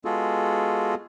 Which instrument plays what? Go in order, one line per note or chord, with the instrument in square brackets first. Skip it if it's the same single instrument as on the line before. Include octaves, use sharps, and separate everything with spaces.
[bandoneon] G#3 B3 F4 F#4 G#4 A4